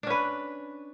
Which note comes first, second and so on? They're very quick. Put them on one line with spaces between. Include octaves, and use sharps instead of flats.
D4 C#4 B4